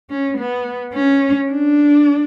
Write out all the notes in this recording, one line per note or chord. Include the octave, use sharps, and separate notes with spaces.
C#4
B3
C#4
D4